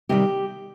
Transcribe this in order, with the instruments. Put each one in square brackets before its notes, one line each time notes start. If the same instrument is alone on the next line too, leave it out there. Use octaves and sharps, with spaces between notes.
[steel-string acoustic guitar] C3 D#3 G3 G4